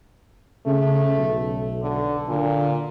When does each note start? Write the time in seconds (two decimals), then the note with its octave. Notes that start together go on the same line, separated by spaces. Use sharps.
0.66 C#3 A3
1.18 B1
1.82 D3
2.29 A#2 D3